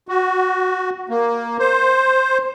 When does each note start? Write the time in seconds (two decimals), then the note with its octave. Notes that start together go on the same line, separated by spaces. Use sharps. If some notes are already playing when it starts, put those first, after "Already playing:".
0.08 F#4
1.09 A#3
1.59 C5